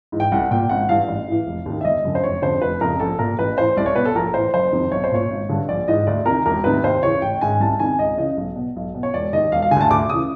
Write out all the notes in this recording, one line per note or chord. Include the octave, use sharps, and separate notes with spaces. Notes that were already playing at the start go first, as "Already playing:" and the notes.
G#2 E3
G5
C2 F#5
A#2 G5
G#1 F#5
G2 E3 F5
A1
A2 E3
F1
D#2 D#3
E5
G1 D#5
F#2 D3
C5
F1 C#5
F2 D3 C5
F1 B4
F2 C#3 A#4
A#1 A4
A#2 A#4
A1 B4
A2 E3 C5
C2 D5
C#5
B2 B4
A4
A#1 A#4
A2 E3 C5
F#1 C5
F2 C3 D#3
B1 C#5
C5
A#2 C#5
G#1
G2 D3
A#1 D5
G#2 E3 D#5
D2 D5
C3 A#4
D#3
E1 A#4
D2 C3 D#3 B4
D#2 C5
C#3 E3 C#5
A1 G5
G#2 D#3 G#5
C2 A5
C3 D#3 G#5
C#2 D#5
C#3 E3 D#5
B1
B2
B1
B2
C#5
E1 D5
D#2 D#3 D#5
E1 F5
F5
D2 D3 G#5 A5
D2 D6
C#3 E3 D#6